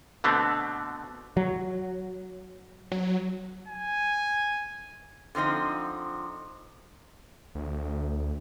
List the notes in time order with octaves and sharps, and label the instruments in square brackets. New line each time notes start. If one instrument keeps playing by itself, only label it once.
[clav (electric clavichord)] B2 D3 A3 B3 C4
[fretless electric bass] F#3
[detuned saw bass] F#3
[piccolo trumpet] G#5
[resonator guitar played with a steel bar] D3 F3 C4 D#4
[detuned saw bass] D2